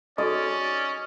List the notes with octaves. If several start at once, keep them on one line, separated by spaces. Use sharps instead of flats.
C#4 D#4 F#4 A4 D5 D#5